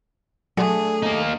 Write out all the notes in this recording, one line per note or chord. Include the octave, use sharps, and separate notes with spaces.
F#3 A3 D4 G#4
A#3 D#4